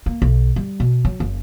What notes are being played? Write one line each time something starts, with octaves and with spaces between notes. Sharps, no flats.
A#3
B1
G3
B2
F#3
F#1